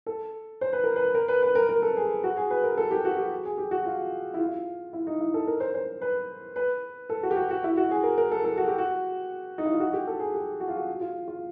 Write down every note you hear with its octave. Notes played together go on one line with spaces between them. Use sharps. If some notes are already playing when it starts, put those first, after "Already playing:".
A4
C5
B4
A#4
B4
A#4
B4
B4
A#4
A#4
A4
G#4
F#4
G#4
B4
A#4
A4
G4
F#4
G4
G#4
G4
F#4
F4
E4
F4
E4
D#4
E4
A4
A#4
C5
C5
B4
B4
A4
F#4
G4
F#4
F#4
E4
F#4
G#4
A#4
A#4
A4
A4
F#4
G4
F#4
D#4
E4
F4
F#4
G4
A4
G#4
G4
F#4
F4
F#4
F4
F4